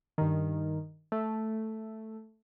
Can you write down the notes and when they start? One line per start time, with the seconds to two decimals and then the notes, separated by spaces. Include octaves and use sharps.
0.18 G2 D#3
1.12 A3